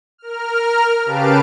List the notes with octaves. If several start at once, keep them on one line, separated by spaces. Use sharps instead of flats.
A#4 F6
C#3 G4 B4 F5 A5 D7